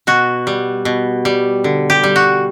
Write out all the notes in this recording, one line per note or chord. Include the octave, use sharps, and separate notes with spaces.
B2 F#4
G3
B2
G3
D3
G4
G3
F#4